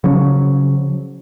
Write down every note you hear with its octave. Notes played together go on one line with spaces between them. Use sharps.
C#3 F3 F#3 C#4